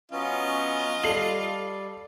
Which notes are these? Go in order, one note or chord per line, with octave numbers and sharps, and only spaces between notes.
F#3 B3 C#4 F4 D#5
G3 A4 C7 F#7